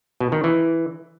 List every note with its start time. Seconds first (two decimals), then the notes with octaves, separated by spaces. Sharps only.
0.20 B2
0.32 D#3
0.44 E3